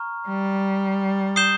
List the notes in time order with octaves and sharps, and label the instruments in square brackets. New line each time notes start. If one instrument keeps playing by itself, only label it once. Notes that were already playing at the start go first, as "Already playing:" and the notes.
Already playing: [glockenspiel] A#5 C#6 F6
[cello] G3
[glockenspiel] D#6 G6 C7 E7 G7